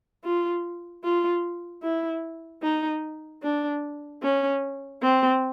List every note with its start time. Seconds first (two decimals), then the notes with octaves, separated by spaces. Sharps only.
0.24 F4
1.04 F4
1.83 E4
2.62 D#4
3.43 D4
4.23 C#4
5.02 C4